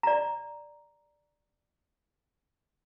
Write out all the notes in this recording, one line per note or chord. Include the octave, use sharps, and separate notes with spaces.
D5 A#5